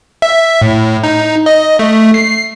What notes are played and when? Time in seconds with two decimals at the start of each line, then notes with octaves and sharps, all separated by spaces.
0.22 E5
0.62 A2
1.03 D#4
1.46 D#5
1.79 A3
2.14 C7